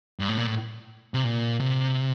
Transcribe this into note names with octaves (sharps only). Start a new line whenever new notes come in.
G2
A2
A#2
A2
C3
A#2
C3